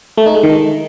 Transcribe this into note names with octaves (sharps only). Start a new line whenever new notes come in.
A3
D#4
G#3
D#3